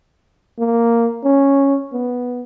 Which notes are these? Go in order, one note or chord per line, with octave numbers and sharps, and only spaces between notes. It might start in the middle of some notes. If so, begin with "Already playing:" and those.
A#3
C#4
B3